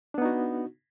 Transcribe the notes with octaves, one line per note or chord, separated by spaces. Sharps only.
B3 D4 D#4 F#4